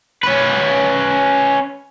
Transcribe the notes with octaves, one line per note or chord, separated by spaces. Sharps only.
C#4 B4